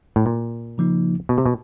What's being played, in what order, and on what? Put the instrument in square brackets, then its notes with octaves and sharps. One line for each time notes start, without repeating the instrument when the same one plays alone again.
[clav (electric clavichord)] A2
A#2
[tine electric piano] C#3 F3 A#3 D#4
[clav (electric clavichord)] B2
C3
B2